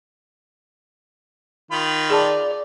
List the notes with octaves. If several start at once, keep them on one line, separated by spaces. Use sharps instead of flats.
D#3 F4 B5
G#4 D5 A5